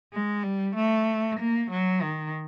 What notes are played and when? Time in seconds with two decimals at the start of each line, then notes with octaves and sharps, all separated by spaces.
0.13 G#3
0.44 G3
0.76 A3
1.39 A#3
1.70 F#3
2.02 D#3